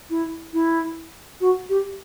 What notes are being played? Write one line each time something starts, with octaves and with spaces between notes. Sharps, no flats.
E4
E4
F#4
G4